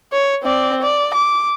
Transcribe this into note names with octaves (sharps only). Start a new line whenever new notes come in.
C#5
C4 D5
D5
D6